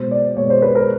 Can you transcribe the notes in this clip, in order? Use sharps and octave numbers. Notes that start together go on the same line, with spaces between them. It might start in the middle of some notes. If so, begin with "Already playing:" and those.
Already playing: B2 G#3 B3 C5
D5
B2 G#3 B3 C#5
C5
B4
A#4